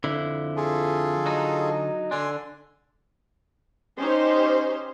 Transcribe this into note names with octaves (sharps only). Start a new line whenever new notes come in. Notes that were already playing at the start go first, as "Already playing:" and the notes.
F2 D3 E4
F4 G#4 A4
F#3 D#4
D3 D4 G#5 C6
C#4 D#4 G4 C5